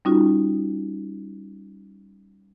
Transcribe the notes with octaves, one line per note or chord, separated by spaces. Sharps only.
G3 C#4 D#4 F4 F#4